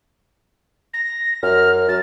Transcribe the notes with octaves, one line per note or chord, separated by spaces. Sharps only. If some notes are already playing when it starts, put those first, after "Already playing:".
A#6
F#2 F6
F#3 A6